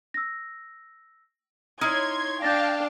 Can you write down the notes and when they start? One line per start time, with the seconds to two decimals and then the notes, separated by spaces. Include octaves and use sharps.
0.14 E6 A#6
1.81 D#4 E4 C#5 C6 F6 G#6
2.42 D4 F5 G5 A5 G6 A6 A#6